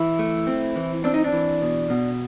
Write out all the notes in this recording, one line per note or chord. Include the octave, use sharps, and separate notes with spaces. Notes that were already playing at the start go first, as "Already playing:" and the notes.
Already playing: E3 E4
A3
C4
E3
C4 D4
D#4
D4
E3
B2
B2